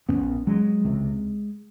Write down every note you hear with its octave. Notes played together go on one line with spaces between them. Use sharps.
A#1 G#2 B3 C#4
F#3 G#3
C#2 C3